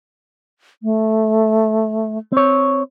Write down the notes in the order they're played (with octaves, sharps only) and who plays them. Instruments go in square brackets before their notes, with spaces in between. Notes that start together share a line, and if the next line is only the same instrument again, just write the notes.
[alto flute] A3
[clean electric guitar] C4 C#5